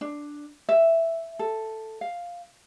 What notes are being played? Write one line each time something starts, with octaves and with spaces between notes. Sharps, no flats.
D4
E5
A4
F5